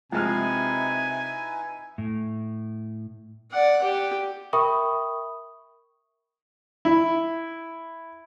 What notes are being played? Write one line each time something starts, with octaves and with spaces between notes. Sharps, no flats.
C3 F3 G#3 D#4 E4 B4 G#5 F6
A2
D5 F#5
G4
A#4 E5 G5 B5 C#6 D#6
E4